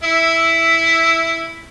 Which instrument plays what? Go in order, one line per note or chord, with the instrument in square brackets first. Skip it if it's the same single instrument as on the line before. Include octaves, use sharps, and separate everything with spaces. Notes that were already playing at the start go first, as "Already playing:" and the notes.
[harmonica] E4 E5